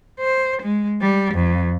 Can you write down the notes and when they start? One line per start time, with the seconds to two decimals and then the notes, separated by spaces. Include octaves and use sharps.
0.20 C5
0.62 G#3
1.01 G3
1.34 F2